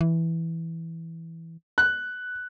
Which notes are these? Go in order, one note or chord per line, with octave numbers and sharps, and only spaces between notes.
E3
F#6